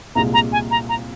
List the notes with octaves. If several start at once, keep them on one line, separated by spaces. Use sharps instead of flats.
C2 A#2 G#3 A#5
A#5
G#5
A#5
A#5